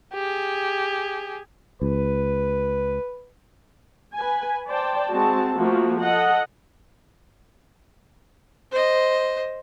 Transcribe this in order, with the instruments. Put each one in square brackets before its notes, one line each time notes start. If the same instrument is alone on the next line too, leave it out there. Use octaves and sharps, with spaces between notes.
[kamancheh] G4 G#4
[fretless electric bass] C#2 [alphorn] B4
[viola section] B4 G#5
C5 D5 G5 A5
G#3 C4 F#4 A5
F3 A3 A#3 F#4
A4 D#5 F#5
[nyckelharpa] C5 D#5